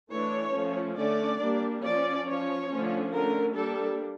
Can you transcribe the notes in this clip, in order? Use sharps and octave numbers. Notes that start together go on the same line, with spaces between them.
E3 A3 D4 C#5
F3 A3 C#4
D3 A3 C#4 D5
G3 A#3 D4
F3 C#4 D5
F3 C#4 C#5
D3 F3 A3 C#4
D3 A3 C#4 A#4
G3 A#3 D4 A4